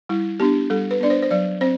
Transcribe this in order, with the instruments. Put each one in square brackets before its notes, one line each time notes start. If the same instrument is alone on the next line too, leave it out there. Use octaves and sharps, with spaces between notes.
[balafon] G3 E4
B3 D4 G4
G3 A4
B4
B3 D4 D5
C5
C5
F#3 D5
C4 C5